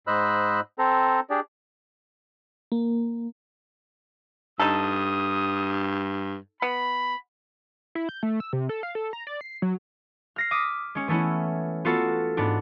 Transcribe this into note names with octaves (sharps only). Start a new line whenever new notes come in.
G#2 C5 D#5 B5 E6 F#6
C4 A4 C5 A#5
D4 G4 G#4 D5
A#3
G2 D#4 A4 D#6
B3 B5
E4
G6
A3
E6
C3
A4
F5
A4
A#5
D5
C7
F#3
F6 A#6 C7
D6 D#6 B6
G#3 C#4
E3 A3 B3 C#4 E4
B3 F4 F#4 A4
G#2 B3 D4